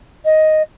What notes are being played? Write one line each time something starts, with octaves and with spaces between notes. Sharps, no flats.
D#5